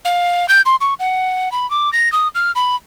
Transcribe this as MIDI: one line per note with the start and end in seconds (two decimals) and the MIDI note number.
0.05 0.46 77
0.49 0.61 91
0.66 0.76 84
0.81 0.94 85
1.00 1.52 78
1.52 1.69 83
1.71 1.90 86
1.93 2.12 94
2.12 2.28 87
2.35 2.51 89
2.55 2.76 83